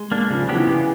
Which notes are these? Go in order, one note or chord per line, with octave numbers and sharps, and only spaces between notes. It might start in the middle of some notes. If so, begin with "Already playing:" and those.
Already playing: G#3
A#3 D4
C#3 F3
F3
F#3 B3 D4 G4
E3
C#3